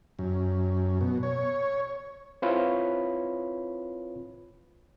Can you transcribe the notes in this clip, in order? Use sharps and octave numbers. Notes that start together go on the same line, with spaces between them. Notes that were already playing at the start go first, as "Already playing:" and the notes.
F#2
B2
C#5
C4 E4 F4 B4 C#5 B5